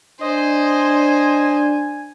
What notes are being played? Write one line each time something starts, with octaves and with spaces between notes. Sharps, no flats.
D4 C5 D#5 G#5